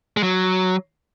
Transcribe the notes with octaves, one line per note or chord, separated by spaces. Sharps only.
G#3
F#3